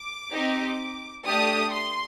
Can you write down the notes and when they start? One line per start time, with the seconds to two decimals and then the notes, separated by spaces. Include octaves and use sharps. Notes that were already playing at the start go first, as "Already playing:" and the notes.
Already playing: D6
0.31 C4 D#4 G4
1.25 A3 D4 G4 D#6
1.72 C6